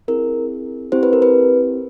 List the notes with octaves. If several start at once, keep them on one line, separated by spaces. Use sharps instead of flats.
C4 E4 G#4 A#4
C4 E4 G4 C5
B4
A#4
B4